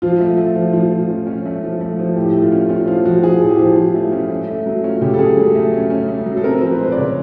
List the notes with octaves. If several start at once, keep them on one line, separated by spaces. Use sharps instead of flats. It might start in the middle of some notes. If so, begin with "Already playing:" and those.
F3 F4
A3
A3
F3
F3
F3
C#4
C#4
A3
F3
A3
F3
A2 G4
A3
F4
C#4
C#4 F4
F3 F4
F3 F#4
F3 G#4
A2
G4
F3
F3
A3
C#4
A3
A3
F#3
C#4 F4
C#3 G4
A4
C#4 G#4
F#3
A3
C#4
C#4
A3
F#3
A4
C4 A#4
F3
B4
G#3 C5
B4
D5
C#3 C#5